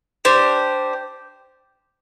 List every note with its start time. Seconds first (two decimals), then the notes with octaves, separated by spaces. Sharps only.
0.25 D4 G4 C5